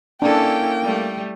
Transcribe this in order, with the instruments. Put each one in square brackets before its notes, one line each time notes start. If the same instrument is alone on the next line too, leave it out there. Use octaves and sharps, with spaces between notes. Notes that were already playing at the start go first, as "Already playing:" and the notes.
[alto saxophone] A#3 [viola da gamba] C#4 E4 A4 [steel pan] D4 [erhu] G5
[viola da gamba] G3 A3